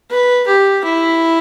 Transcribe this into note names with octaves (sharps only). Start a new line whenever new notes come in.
B4
G4
E4